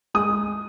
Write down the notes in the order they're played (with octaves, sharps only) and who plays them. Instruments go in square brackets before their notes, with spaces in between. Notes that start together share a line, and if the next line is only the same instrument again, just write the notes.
[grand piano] G#3 D#6